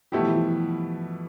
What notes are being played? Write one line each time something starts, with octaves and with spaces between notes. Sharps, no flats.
B2 G3 A3 E4 G4
F3
E3
F3